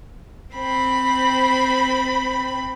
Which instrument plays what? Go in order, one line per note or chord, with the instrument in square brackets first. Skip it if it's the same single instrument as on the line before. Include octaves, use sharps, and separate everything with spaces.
[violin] C4 B5